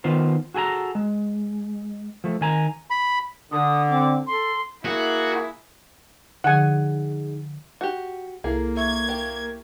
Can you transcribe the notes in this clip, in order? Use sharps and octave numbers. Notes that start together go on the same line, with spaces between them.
D#3 B3 F4 C5
F#4 G#4 A4 G#5 A#5
G#3
F3 A3
D#3 G#5 A#5
B5
D3 D#6
C4 D6
A4 C6
A#3 E4 F#4 G#4
D3 F3 D#4 G#4 F#5 G#5
F#4 G4
C2 A#3 E4 G#4 A4
E5 C#6 G#6
G4